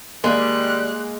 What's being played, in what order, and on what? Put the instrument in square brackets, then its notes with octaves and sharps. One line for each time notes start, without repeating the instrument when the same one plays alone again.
[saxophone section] D#3 G3 [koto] G#3 [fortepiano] A#3 [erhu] F#6